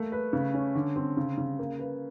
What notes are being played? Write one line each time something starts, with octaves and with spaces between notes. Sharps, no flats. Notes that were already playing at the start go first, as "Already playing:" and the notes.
Already playing: A3 A#3
B4
C#3
C#4
D3
C4
C#3
C#3
A#3
B4